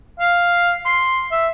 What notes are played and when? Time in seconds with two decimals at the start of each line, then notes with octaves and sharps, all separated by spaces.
0.20 F5
0.85 C6
1.32 E5